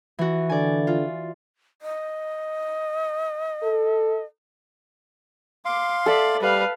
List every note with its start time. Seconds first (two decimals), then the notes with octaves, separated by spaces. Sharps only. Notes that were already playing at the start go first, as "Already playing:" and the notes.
0.19 E3 F#4
0.49 D3 D5 G#5
0.87 F4
1.82 D#5
3.63 A4
5.65 F5 C6 D6
6.06 A4 D5 E5
6.42 G3 B4 F5